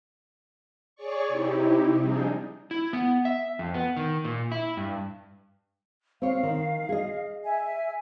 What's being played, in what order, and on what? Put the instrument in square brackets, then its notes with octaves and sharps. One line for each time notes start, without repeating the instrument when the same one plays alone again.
[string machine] G#4 C#5 D5 C#6
C3 D#4 E4 G4
F3 G3 C4 D4 D#4 G#4
[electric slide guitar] E4
B3
E5
F2
B3
D#3
A#2
E4
G2
[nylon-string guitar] C4 C#5 [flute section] F5
[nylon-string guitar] D#3
G#4 D#5
[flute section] E5 G#5